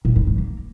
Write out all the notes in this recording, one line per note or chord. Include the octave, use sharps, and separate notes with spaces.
A#2
G2
E3
A#3